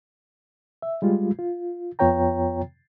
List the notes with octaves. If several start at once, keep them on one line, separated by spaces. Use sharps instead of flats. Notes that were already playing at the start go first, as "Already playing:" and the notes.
E5
G3 G#3 F4
F4
F2 B3 F4 C#5 G5 A#5